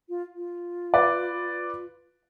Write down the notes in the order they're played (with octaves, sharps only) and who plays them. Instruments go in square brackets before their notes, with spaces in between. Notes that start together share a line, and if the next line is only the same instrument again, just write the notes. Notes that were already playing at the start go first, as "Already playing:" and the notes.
[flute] F4
F4
[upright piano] B4 D5